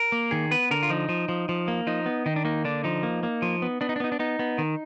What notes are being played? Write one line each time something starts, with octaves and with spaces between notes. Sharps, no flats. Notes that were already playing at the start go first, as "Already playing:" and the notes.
Already playing: A#4
A#3
D#3 G#4
B3 B4
D3 A#4
F4
F3 D#4
F3
F3
F3
A#3
F3 D#4
B3
D#3 D#4
D4
A#3 D#4
D3 D4
F3 D#4
A#3
A#3
F3
B3
B3 D4
D#4
D4
B3 D#4
D4
B3 D#4
B3
D#3